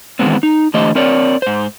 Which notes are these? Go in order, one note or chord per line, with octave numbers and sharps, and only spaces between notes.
D#3 E3 G#3 B3 C4
D#4
D3 E3 A3 G4 C5 D#5
C4 A#4 C#5 D5
G#2 C5